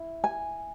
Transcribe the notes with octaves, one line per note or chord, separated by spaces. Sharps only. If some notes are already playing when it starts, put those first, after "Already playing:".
Already playing: E4
G#5